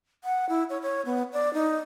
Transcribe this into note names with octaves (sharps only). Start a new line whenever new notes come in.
F#5
E4
C#5
C#5
B3
D5
D#4